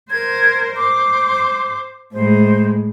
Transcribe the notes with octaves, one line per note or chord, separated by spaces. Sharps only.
A#4 C5 G#6
C5 D6
A2 G#3 C5